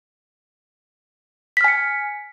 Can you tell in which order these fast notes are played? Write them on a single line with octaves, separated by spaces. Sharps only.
B6 F6 G#5 C#7